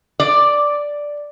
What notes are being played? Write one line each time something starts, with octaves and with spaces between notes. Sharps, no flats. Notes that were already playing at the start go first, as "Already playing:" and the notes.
D5